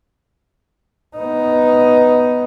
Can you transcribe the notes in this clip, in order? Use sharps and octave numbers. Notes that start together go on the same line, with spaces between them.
B3 D#4